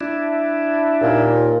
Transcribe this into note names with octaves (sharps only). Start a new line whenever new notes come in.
D4 E4
D#2 A#2